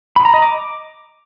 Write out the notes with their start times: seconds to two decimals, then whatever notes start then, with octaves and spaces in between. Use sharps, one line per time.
0.16 B5
0.25 A#5
0.34 D#5
0.42 D6